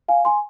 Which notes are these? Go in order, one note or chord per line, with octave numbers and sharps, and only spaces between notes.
F5 G#5
G#5 C6